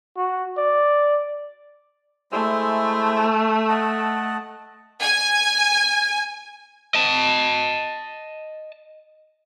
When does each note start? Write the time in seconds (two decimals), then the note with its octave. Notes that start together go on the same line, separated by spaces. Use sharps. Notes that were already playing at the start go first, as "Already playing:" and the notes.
0.17 F#4
0.58 D5
2.32 G#3 A3 E4 C5
3.69 D#5 F#5 A5
5.02 G#5
6.94 D#5 A5